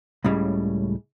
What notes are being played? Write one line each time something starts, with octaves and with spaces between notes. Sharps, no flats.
C#2 A2 C#3 G3